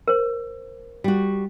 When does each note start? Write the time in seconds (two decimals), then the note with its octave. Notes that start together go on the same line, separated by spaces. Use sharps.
0.08 A#4 C5
1.04 G3 F#4